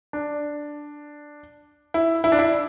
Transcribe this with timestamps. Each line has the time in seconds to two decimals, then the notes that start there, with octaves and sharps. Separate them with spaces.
0.13 D4
1.94 E4
2.24 E4
2.32 D4
2.39 E4